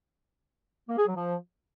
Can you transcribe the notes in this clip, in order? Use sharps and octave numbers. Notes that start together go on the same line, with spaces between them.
A#3
G#4
F#3
F3